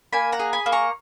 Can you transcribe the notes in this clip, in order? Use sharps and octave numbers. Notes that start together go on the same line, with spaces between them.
A#3 G#5 B5
F#5 A#5
G#4
G#5 B5
A#3
A#5 C#6